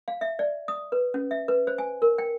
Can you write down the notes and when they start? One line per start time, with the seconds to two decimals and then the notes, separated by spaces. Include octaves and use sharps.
0.08 F5
0.21 E5
0.39 D5
0.68 D#6
0.92 B4
1.14 C#4
1.31 E5
1.48 B4
1.67 C5
1.78 G#5
2.02 A#4
2.18 G5